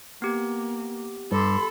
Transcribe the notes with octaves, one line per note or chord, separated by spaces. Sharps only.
A#3 B3 G4
G2 A4 B5 C6